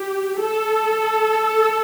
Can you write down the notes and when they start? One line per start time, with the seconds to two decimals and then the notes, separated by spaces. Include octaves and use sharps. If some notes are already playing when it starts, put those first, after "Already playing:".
Already playing: G4
0.41 A4